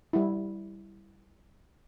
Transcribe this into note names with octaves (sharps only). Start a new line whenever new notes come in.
G3 E4